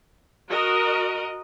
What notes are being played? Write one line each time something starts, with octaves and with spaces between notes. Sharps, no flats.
F#4 A#4 D#5